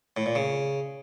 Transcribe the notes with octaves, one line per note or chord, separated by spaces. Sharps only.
A2
A#2
C#3